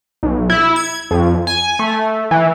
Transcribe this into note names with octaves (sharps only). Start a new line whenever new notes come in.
B1
E4
G#6
F2
G#5
A3
E3